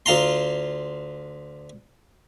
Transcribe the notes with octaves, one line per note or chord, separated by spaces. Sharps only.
D2 F4 A#5 C6